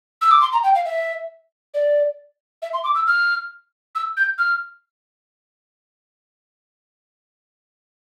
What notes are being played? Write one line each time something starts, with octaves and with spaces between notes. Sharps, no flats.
E6
D6
C6
A#5
G5
F5
E5
D5
E5
C6
D6
E6
F6
E6
G6
F6